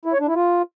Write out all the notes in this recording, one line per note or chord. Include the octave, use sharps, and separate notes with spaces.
E4
C#5
D4
E4
F4